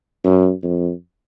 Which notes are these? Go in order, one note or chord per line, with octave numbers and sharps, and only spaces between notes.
F#2
F2